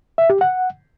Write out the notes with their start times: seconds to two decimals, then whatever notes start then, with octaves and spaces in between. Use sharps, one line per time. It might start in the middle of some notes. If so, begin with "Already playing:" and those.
0.18 E5
0.30 G4
0.41 F#5